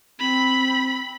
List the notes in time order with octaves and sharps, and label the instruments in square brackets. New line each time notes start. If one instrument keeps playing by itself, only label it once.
[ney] C4 [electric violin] B5